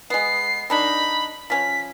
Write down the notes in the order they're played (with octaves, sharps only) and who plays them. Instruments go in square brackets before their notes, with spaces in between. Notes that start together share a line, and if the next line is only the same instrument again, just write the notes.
[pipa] G#3 B3 [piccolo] C7
[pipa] D#3 D4 D#4 [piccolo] B5
[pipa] F3 C#4 [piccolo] B6